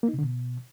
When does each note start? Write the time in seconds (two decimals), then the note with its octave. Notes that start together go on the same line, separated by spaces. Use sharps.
0.03 A#3
0.08 D#4
0.13 C3
0.19 D3
0.24 B2